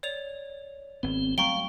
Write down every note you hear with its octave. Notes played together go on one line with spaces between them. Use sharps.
C#5 D5 F7
G#1 B3 C4
F#3 G3 A3 F5 G5 A#5 C#6 G7